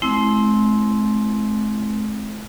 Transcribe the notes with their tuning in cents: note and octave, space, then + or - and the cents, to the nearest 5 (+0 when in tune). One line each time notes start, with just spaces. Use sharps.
G#3 +45 C4 +5 E4 -10